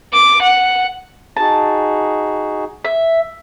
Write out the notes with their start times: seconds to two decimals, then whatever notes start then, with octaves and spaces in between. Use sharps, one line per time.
0.13 D6
0.42 F#5
1.37 D#4 F#4 G#4 A5
2.84 E5